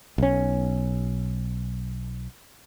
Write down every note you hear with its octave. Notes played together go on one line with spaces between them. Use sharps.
B1 C#4